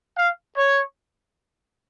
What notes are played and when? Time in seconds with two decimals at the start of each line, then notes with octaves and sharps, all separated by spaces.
0.16 F5
0.57 C#5